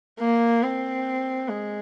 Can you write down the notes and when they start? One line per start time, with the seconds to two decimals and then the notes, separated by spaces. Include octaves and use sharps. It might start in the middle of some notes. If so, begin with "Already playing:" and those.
0.20 A#3
0.63 C4
1.49 G#3